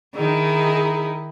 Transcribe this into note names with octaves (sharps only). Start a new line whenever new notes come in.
D#3 D#4 E4 G#4